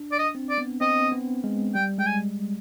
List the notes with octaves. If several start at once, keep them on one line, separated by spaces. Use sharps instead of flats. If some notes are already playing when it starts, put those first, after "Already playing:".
Already playing: D4
D5
D#5
C4
D5
B3
C4 D#5
B3
G#3
G3 G5
G#3 G5
G#5